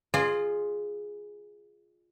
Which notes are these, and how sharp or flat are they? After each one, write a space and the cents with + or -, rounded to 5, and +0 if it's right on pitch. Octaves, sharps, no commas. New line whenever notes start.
F4 +0 G#4 +0 D#5 -45